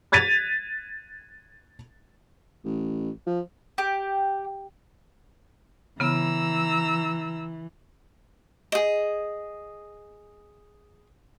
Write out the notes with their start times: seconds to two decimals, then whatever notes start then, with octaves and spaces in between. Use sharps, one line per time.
0.12 F#6 G#6 A6 B6 D#7 F7
2.65 A1
3.27 F3
3.78 G4
6.00 C#3 E3 B3 A#5 E6
8.72 G#4 D#5